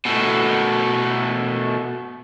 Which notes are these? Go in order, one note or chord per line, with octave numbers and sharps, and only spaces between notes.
B2 A3